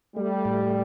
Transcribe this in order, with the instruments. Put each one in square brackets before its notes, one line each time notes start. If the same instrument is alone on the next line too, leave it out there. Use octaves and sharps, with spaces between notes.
[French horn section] G3 [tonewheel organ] A3
[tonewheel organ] A2